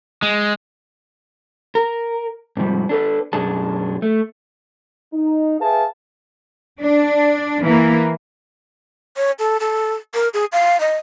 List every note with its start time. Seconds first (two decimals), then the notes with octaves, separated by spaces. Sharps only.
0.22 G#3
1.75 A#4
2.57 G#2 C3 F3 G3
2.89 D4 A4 B4
3.33 F#2 B2 D4 G#4 A5
4.02 A3
5.13 D#4
5.60 G#4 B4 E5 F5 G#5 A5
6.81 D4
7.61 E3 A#3
9.17 C#5
9.39 A4
9.60 A4
10.14 A#4
10.34 G#4
10.52 F5
10.80 D#5